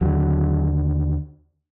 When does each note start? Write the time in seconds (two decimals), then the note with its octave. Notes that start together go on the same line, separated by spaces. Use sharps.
0.01 D#2 D3 F#3